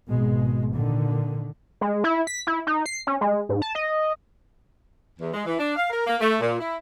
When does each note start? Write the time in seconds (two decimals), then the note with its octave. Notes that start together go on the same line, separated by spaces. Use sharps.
0.11 G#1 B2 G#3
0.75 A#2 D3 D#3
1.81 G#3
2.04 E4
2.27 B6
2.47 E4
2.67 D#4
2.86 C7
3.07 C#4
3.21 G#3
3.49 G#2
3.62 A5
3.75 D#5
5.20 E2
5.34 G#3
5.45 E3
5.59 D4
5.76 F5
5.90 A#4
6.07 A#3
6.21 A3
6.40 A#2
6.60 E4